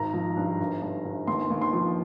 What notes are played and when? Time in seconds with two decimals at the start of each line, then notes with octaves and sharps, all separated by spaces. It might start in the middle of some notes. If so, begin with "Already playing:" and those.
Already playing: G#1 A#5
0.14 F3
0.37 G2
0.59 G1
0.82 G2
1.05 G1
1.27 D#2 C6
1.50 D#2
1.62 C6
1.73 F3